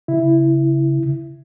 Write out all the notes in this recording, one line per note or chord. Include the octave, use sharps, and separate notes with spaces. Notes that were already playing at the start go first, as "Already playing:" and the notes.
C#3 E4